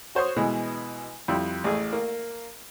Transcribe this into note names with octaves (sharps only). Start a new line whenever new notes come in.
F#4 C5 C#5 C6 D#6
B2 E3 G#3
F2 G3 E4 C6
A1 A3 G#4
A#3